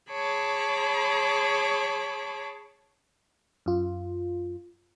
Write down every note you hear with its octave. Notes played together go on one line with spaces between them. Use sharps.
G#4 C#5 A5 B5 D6
F#2 F4